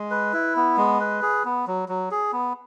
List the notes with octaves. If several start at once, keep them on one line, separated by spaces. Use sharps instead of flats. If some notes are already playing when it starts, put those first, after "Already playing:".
Already playing: G#3
B4
E4
B3
G#3
B4
G#4
B3
F#3
F#3
G#4
B3